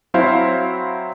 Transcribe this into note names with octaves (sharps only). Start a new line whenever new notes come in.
F#3 C4 E4 C5 F5